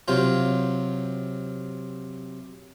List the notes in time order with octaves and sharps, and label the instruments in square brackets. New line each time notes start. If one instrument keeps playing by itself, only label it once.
[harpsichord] C3 F#3 F4